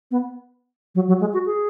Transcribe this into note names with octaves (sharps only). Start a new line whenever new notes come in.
B3
F#3
F#3
G#3
F#4
G#4